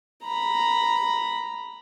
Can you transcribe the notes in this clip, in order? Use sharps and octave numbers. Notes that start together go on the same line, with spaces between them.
A#5 B5